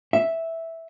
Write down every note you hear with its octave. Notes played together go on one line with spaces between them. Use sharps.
E5